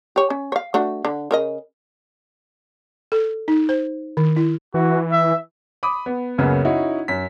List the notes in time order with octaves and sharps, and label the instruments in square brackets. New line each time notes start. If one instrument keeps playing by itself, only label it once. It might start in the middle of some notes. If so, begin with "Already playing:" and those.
[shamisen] G4 C#5
C#4
C#5 F5
A3 D4 F#4
D3
C#3 A#4 D#5
[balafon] A4
D#4
C5
D#3
E4
[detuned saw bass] E3 [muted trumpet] F#4
[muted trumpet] E5
[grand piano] B5 D6 D#6
B3
C#2 F#2 C#3 A#3 B3
C#4 D#4 E4 F#4
F#2 B6